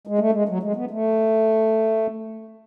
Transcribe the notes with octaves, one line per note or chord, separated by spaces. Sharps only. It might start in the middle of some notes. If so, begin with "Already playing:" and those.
G#3
A3
G#3
F#3
G#3
B3
A3